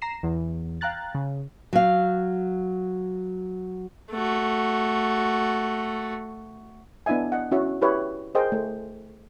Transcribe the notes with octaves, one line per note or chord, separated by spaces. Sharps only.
A#5 A#6 C7 E7
E2
F5 G5 A#5 F#6 A6
C#3
F#3 F5
A3 F#4
B3 D4 E4 D#5 E5 G#5
D#5 F#5
C#4 E4 F#4 E5
E4 G4 B4 C#5 E5
G#4 A#4 C5 D#5 G5
A3